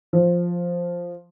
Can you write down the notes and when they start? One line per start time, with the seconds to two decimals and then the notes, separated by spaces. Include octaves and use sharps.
0.13 F3